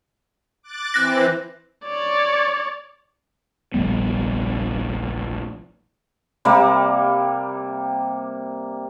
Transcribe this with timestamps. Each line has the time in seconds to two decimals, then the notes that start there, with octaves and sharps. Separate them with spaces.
0.63 D6 F#6 A6
0.94 E3 C4 F#6 A#6
1.85 C#5 D5
3.74 F1 A#1 G3 B3
6.45 C3 G3 A#3